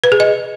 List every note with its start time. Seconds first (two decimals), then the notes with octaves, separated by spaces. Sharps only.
0.04 B4
0.12 G#4
0.20 D#5